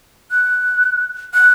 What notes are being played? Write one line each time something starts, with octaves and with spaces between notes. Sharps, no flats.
F#6
F#6